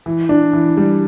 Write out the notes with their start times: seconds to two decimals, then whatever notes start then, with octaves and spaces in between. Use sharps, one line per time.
0.06 E3
0.29 D4
0.53 E3
0.77 G3